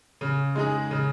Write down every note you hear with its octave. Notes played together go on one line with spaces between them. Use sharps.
C#3
G#3 D#4 G#4
C#3